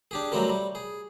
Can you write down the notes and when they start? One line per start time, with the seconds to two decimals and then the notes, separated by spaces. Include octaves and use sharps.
0.11 D4 G4 G#4
0.32 F#3 G3 A3 C4 F#4 A#4
0.49 G3
0.75 G#4